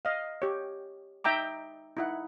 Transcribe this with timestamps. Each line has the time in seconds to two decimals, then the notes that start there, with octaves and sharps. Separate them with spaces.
0.05 D#5 F5
0.42 G4 C#5
1.24 D#4 E5 G5 A#5 D6
1.97 D#4 E4 F#5